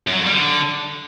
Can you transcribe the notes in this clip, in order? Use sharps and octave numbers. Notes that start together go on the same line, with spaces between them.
F#2
F#3
F2
G3
D3